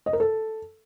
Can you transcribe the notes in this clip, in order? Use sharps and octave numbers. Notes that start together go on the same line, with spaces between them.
D#5
A#4
A4